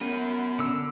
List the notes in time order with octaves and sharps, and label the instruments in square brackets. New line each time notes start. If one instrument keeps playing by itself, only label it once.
[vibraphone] B3 [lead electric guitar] C#4 A#4
[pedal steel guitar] D3 E6